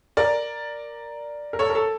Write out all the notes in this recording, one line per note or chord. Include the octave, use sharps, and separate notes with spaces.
A#4 D5
A#4
A4 C#5
A#4
A4